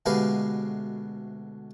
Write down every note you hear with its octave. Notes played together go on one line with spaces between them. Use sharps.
D2 B2 G#3 G4 B4 F5